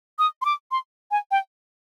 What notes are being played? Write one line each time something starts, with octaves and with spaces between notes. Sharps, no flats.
D#6
C6
D6
C6
G#5
G5